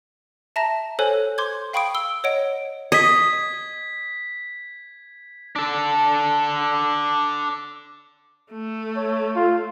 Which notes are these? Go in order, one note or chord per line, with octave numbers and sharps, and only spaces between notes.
E5 A5 A#5 A#6 E7
A4 C5 C#5 G#5 F#6
C6 D6 G6 G#6
F5 G5 B5 C#6 D#6 D7
E6 G7
C#5 D#5 F#5 D7
D#5 G#6 B6
D4 A4
A3
C#5
F4